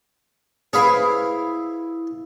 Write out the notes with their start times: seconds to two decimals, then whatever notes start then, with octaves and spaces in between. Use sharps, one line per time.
0.73 E4 G#4 B4 C#5 F5 B5